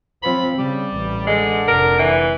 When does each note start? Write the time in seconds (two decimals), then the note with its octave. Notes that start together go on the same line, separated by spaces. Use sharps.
0.23 F3 C4 F4 C#5 B5
0.57 C#3 G3
0.94 A1
1.27 D3 G#3
1.68 F1 A#4
1.99 E3